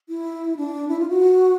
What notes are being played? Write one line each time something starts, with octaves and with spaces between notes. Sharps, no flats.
E4
D4
E4
F4
F#4